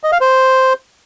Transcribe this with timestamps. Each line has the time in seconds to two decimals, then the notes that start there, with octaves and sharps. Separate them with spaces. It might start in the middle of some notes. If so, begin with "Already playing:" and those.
0.04 D#5
0.12 F5
0.21 C5